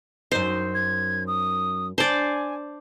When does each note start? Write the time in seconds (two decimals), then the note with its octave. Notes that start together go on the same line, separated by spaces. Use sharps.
0.32 F#2 D#4 C5
0.74 G#6
1.27 D#6
1.98 D4 C5 D5 G#5